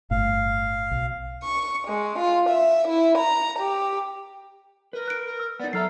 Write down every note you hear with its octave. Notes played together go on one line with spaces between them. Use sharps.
G1 A2 F5
B1
C#6
G#3
F4
E5
E4
A#5
G4
A#4 B4
F#6 D7
A#4
E6
B3 D#4 D5
F#3 A4 E5 A#5 F6 C7